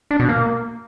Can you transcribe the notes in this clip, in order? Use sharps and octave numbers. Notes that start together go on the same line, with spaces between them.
D4
B2
A#3